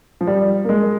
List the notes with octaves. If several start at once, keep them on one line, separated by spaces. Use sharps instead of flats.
F3
G3
A#3
G#3